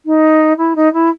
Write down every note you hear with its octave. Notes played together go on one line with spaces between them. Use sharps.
D#4
E4
D#4
E4